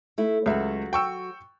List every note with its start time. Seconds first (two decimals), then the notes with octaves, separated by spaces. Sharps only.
0.18 A3 E4
0.46 C#2 F#3 F#4 E5
0.93 G5 C#6 E6